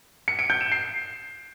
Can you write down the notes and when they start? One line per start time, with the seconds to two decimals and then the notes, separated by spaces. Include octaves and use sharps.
0.28 C#7
0.39 D7
0.50 G6
0.61 E7
0.72 C7